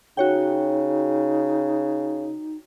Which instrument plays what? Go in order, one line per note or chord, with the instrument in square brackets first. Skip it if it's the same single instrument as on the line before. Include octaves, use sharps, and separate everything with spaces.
[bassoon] C#3 [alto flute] D#4 [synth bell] F#4 C#5 G5